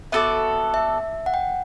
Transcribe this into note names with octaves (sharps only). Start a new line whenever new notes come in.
B3 F#4 A4 D5 E5
E5
F#5
G5